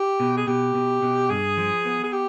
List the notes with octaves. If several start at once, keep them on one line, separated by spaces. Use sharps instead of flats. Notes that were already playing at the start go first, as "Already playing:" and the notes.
Already playing: G4
B2
G#4
B2 G4
B2
B2
G2 G#4
F3
B3
G#4
G4